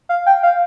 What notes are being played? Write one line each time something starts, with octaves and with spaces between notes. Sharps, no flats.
F5
G5
F5